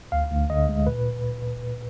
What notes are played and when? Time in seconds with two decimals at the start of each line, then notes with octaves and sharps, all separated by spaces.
0.12 D2 F5
0.31 D2
0.50 D3 D#5
0.69 G#3
0.87 A#2 B4